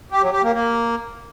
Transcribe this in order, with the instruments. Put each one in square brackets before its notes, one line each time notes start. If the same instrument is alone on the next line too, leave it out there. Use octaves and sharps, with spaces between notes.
[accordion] G4
F#3
G4
A#3
A#3